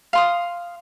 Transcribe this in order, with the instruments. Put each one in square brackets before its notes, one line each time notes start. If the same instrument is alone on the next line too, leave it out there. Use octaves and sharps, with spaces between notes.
[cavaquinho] F5 C6 D#6